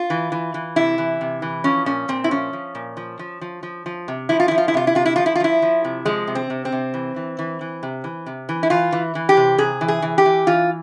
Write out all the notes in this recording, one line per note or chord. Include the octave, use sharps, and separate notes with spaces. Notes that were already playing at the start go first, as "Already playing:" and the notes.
Already playing: F4
E3
E3
E3
C3 E4
E3
C3
E3
F3 C#4
A#2 C#4
A#2 C4
E4
F3 C#4
F3
A#2
F3
F3
F3
F3
F3
C3
F3 E4
F4
F3 E4
F4
E4
C3 F4
E4
C3 F4
E4
F3 F4
E4
F4
F3 E4
F3
C3
F3 G#3
C3
C4
C3
C4
C3
E3
E3
E3
E3
C3
E3
C3
E3
E4
E3 F4
E3
E3
G4
C3
C3 G#4
E3
G#4
E3
G4
E3
E3 F4